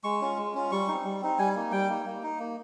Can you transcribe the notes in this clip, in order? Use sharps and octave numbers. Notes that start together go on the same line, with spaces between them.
G#3 C#6
C#4 F4
G#3
C#4 F4
G3 C#6
C4 D#4
G3
C4 D#4
G3 G#5
A#3 D#4
G3 G5
A#3 D#4
A#3
D#4
A#3